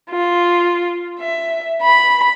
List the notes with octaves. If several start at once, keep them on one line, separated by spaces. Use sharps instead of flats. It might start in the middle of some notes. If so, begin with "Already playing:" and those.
F4
E5
B5